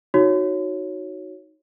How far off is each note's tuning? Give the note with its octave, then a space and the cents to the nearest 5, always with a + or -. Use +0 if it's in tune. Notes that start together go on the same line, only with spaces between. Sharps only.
D#4 +10 F#4 +0 C#5 +0